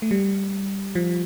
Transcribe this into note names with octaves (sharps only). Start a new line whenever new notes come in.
A3
G3
F3